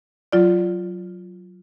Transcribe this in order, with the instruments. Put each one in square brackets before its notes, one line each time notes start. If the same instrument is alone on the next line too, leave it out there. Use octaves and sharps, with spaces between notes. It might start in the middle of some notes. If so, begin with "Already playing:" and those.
[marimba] F#3 F4 D5